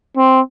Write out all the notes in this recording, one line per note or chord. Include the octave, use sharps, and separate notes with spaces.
C4